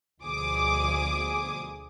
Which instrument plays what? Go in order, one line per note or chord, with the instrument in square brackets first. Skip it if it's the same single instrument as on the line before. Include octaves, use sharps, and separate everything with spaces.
[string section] D2 B2 F3 G#4 D6 D#6